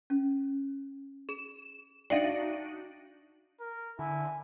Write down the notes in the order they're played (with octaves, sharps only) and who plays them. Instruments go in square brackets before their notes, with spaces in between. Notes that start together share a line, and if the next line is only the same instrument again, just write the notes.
[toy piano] C#4
[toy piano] G#4 [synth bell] E7
[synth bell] D4 D#4 F#4 [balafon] D5 E5 F5 [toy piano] G5
[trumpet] A#4
[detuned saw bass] D3 [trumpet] E4 [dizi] G#5